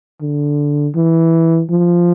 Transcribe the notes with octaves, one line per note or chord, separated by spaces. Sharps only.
D3
E3
F3